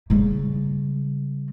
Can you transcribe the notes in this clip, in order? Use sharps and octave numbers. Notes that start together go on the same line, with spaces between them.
C#3 G3